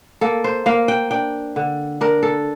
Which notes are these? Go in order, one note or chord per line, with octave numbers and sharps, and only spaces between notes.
A#3 A4
C5
A#3 F5
G5
D4 G5
D3
D4 A#4
A4